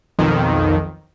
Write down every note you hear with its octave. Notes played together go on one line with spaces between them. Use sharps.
B1 F2 D#3